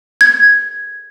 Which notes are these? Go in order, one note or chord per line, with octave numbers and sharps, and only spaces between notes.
G#6